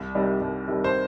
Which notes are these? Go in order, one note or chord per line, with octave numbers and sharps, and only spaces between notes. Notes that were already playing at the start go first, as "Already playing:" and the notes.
Already playing: C2
C3 D#3 G3
C2
C3 D#3 G3
C5